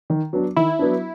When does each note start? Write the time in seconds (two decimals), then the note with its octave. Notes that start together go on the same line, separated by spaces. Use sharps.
0.10 D#3
0.33 F#3 B3 D4
0.57 D#3 E4
0.79 F#3 B3 D4